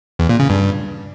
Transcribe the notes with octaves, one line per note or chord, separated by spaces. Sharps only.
E2
A#2
C#3
G2